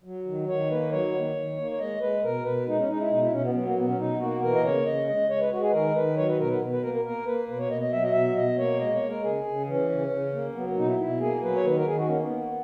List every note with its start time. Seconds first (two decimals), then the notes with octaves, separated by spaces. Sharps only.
0.04 F#3
0.26 D#3
0.48 D#3 C#5
0.70 A#3 B4
0.92 F#3 C#5
1.13 D#3
1.36 D#3
1.58 A#3
1.71 C#5
1.79 G#3 D#5
2.01 G#3 B4
2.23 B2 A#4
2.45 B2 B4
2.67 G#3 D#4
2.78 C#4
2.88 G#3 D#4
2.99 E4
3.10 B2 D#4
3.21 E4
3.32 B2 C#4
3.44 B3
3.54 F#3 B3
3.65 A#3
3.76 B2 B3
3.87 C#4
3.98 B2 D#4
4.20 A#3 F#4
4.42 E3 A#4
4.55 D#5
4.63 C#3 C#5
4.85 C#3 D#5
5.08 G#3 D#5
5.30 G#3 C#5
5.40 B4
5.52 G#3 F#4
5.62 G#4
5.69 B4
5.73 D#3 A#4
5.95 D#3 B4
6.17 F#3 C#5
6.28 B4
6.39 B2 A#4
6.50 B4
6.60 B2
6.72 B4
6.83 A#3 A#4
6.94 A#4
7.04 A#3 A#4
7.26 A#3 B4
7.48 B2 B4
7.59 C#5
7.70 B2 D#5
7.81 D#5
7.92 F#3 E5
8.02 D#5
8.13 B2 E5
8.36 B2 D#5
8.57 A#3 C#5
8.80 G#3 D#5
8.94 C#5
9.02 G#3
9.08 A#4
9.23 C#3 G#4
9.45 C#3
9.67 E3 C#4
9.90 C#3
10.11 C#3
10.33 A#3
10.55 F#3 B3
10.77 B2 D#4
10.87 E4
10.99 B2 E4
11.20 A#3 G#4
11.42 F#3 B4
11.55 C#5
11.64 D#3 B4
11.76 A#4
11.86 D#3 G#4
11.98 F#4
12.08 A#3 C#4
12.19 B3
12.30 A#3